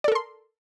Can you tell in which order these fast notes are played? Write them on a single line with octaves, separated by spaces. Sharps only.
D5 A4 A#4 C6